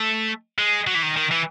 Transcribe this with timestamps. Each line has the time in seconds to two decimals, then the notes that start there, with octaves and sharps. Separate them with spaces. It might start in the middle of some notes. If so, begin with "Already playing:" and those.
Already playing: A3
0.58 G#3
0.87 F#3
0.95 E3
1.02 D#3
1.16 D#3
1.31 E3